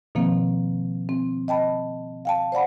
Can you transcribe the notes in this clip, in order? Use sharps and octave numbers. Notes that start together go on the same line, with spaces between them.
B2 D#3 F3 A#3 C4
C4
D#5 G5 A5 B5
F5 G5 A5
C5 D5 F#5 B5